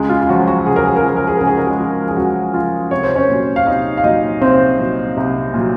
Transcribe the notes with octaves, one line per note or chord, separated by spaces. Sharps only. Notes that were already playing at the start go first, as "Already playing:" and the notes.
Already playing: C#2 G#3 G#4
F4
F4
C#3 F3 F#3 F#4
F#3 F#4
C#2 G#4
A#4
G#4
A#4
C#3 F3 G#4
A#4
G#4
C#2 A#4
G#4
A#4
G#3 G#4
C#3 F3
G#4
C#2 F#3 F#4
C#3 F3 F4
C2 C#5
C5
C#4 C#5
A#2 F#3
F5
C2 D#4 D#5
F5
A#2 F#3 D#4 D#5
C2 C4 C5
A#2 F#3
C2
A#2 F#3